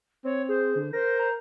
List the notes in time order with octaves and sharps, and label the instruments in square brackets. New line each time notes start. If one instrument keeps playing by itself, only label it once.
[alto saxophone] C4 [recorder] C#5
[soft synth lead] G#4 [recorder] C5
[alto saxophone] D3
[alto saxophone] A#4 [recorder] C5 [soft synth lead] A#6
[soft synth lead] A#5